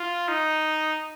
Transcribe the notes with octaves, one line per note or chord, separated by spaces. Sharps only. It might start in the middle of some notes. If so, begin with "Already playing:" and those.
Already playing: F4
D#4